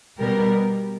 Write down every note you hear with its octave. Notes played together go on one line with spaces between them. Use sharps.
B2 G3 B3 G4 A#4